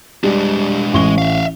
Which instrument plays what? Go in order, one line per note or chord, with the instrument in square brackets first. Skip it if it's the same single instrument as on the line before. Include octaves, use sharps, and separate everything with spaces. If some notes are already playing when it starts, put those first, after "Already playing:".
[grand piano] G3 [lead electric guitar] G#3 D4
[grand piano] A1 C#6 G7 [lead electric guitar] G#3
[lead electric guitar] E5 F5